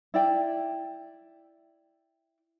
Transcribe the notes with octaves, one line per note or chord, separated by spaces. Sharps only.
E4 D5 G5